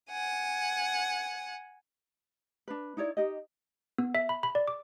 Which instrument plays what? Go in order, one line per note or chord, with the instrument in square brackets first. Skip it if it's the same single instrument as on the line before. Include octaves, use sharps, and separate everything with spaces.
[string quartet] F#5 G#5
[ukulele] D4 B4
D#4 E4 C#5 D5
D#4 G4 D#5
[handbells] B3
E5
B5
B5
D5
D6